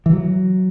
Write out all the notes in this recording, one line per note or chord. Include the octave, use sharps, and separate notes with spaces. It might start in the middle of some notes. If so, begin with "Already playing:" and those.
E3
F#3